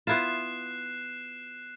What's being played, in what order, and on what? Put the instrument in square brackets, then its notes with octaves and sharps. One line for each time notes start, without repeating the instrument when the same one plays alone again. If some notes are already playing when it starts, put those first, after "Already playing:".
[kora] B3 E4 F4 [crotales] F#6 C7 E7